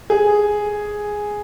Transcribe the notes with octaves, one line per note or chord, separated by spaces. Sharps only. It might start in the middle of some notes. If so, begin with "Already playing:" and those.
G#4